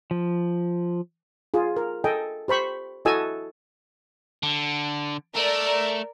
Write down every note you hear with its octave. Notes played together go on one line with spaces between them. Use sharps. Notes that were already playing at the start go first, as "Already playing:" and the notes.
F3
F4 G#4
A#4
A4 D#5 G5 G#5
G4 C5 B5 C#6
E4 F#4 A4 D#5 G#5 E6
D3
A3 A#4 D5